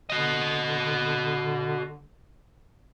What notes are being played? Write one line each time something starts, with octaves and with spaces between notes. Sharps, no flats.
D3 F#4 D#5